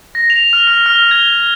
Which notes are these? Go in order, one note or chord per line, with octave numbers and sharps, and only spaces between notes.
A#6
F7
F6
F6
F6
G#6